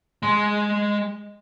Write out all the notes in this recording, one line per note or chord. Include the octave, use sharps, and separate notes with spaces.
G#3 C6